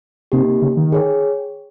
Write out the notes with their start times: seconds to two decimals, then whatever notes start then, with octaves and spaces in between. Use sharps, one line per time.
0.32 C3 A#3 D#4 G4
0.62 C#3
0.77 D#3
0.92 G#4 C#5 G5